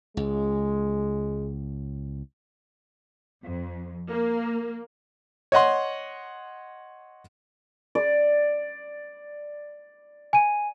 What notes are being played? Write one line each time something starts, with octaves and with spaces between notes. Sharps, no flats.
C#2 G#3
F2
A#3
C#5 D#5 F#5 C6
D5
G#5 D#7